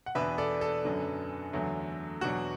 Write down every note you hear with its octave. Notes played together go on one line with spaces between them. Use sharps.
F#5
E2 B2 B3 D4 B4 E5
A4 D5
A4
F#2 D3 F#3 B3
E2 D3 F#3 A3
E2 B2 F#3 D4 F#4